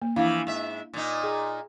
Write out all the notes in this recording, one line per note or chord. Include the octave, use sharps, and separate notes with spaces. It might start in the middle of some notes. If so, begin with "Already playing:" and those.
A#3
E3 F3 D4 E4 F5
G#2 E5
A#2 D#4
G#4